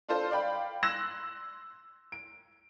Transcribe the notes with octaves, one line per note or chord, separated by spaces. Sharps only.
D4 F4 A4 C5
D5 F5 G5 B5
C6 E6 F#6 A#6 E7
D7